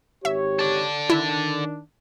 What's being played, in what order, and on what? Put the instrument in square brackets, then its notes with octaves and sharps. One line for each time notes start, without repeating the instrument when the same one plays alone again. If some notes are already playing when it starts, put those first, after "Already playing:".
[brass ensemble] G#1 G4 C#5 [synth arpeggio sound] E5
[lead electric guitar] A4 D5
[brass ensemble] D#3 D4 [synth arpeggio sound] E4